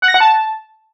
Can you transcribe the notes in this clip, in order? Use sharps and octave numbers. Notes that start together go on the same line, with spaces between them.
F#5
A#6
F#5
A5